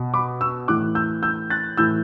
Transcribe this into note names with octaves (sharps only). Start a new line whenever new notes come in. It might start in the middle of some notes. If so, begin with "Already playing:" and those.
Already playing: B2
B5 D6
C#6 E6
A2 E3 D6 F#6
E6 G6
E6 G6
F#6 A6
A2 E3 E6 G6